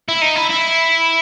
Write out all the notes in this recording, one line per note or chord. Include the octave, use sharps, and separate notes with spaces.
E4
D#4
E4
E4